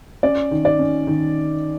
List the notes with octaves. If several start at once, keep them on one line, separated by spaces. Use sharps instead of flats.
C#4 D5
D#3
D5
C#4
D#3